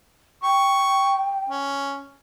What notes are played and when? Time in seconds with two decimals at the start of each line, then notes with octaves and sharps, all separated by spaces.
0.43 G5 C#6
1.49 C#4